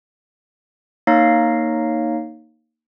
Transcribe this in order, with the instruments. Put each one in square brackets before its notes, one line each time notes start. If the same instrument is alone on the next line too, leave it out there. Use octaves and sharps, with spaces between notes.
[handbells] A#3 D#4 C#5 F5 A#6 C7